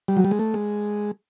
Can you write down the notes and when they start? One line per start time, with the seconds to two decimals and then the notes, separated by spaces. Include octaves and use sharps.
0.08 G3
0.17 F#3
0.24 G3
0.31 G#3
0.39 A3
0.54 G#3